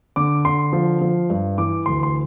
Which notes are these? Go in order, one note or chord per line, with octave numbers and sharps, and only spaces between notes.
D3 D6
D3 C6
F3
F3
G2
E3 D6
D2 C6
C6